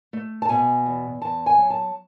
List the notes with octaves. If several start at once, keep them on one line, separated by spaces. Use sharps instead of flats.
A3
A5
B2 G#5
E2
E2 A5
G#5
F#3
A5